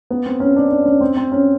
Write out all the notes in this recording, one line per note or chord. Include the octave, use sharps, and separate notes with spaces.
B3
C4
C#4
D4
D4
C#4
C4
C4
C#4